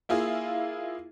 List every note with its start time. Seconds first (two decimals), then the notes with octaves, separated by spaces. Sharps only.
0.09 A#3 E4 F4 G#4